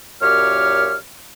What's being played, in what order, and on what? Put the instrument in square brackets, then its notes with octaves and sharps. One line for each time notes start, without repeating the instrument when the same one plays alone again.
[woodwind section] F#2 A#2 G4 C#5 F6